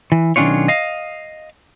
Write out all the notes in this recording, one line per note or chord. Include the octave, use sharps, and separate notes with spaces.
E3
B1 D#3 C#4 D4 F4 C#5
D#5 F5